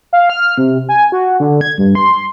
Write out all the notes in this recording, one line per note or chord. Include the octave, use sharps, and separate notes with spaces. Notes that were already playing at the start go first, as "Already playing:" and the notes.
F5
F6
C3
G#5
F#4
D3
G#6
G2
C6